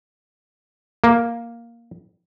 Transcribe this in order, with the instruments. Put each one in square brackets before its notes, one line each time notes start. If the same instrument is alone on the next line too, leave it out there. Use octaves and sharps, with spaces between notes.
[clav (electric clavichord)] A#3